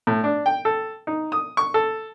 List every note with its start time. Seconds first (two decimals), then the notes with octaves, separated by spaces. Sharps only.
0.07 A2
0.24 D4
0.46 G5
0.65 A4
1.07 D#4
1.32 D#6
1.57 C#6
1.74 A4